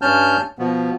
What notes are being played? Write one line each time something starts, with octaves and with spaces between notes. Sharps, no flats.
G2 C#4 A5 F6 G6
B2 F3 B3